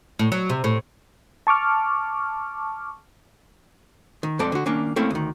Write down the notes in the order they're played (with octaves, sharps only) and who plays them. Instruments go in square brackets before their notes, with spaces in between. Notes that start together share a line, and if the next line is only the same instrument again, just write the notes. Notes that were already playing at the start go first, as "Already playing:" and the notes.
[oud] A2
F#3
C3
A2
[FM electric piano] A5 C#6 D6 F6
[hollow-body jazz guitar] D#3
F2 G#3 C4 A4 D5 A5
D3 F#4
D#3 A#3 C#4 D4
A3 A#3 C4 C#4 E4
D2 D#3